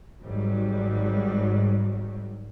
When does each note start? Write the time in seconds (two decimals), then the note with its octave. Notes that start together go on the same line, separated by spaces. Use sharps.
0.23 G#1 G#2 F#3 G3